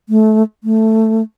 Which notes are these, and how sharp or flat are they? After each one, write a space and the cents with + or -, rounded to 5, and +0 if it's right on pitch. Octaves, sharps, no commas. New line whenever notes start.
A3 -20
A3 +5